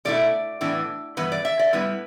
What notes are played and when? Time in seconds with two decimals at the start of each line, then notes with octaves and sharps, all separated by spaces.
0.05 B2 A3 E4 D5
0.61 A2 E3 B3 D4
1.17 G2 E3 B3 B4
1.32 D5
1.45 E5
1.59 D5
1.73 A2 G3 B3 E4 B4